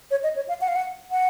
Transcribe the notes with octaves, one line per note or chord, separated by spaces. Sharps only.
C#5
D#5
C#5
F5
F#5
F5
F#5
F#5